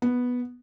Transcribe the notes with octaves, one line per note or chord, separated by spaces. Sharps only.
B3